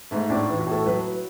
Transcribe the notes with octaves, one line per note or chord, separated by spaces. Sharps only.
G#2 A3
A2 D4
E3
F#4
A2 A4
F#3 B4